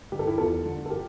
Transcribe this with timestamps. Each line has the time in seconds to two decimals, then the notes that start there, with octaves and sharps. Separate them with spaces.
0.12 D3 F3 G4
0.19 A4
0.27 E4 G4
0.38 E2 F4 A4
0.65 D3 F3
0.86 A4
0.90 G4 A#4